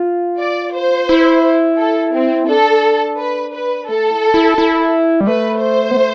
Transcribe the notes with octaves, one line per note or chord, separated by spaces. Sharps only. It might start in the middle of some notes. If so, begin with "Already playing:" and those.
Already playing: F4
D5
C5
E4
A4
C4
D4 A4
B4
B4
A3 A4
E4
E4
E4
G3
A3 B4
C5
B3
A3